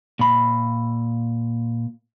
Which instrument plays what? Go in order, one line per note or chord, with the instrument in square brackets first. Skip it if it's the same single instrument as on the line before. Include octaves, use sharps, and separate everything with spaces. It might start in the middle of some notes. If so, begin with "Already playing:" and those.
[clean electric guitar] A#2 B5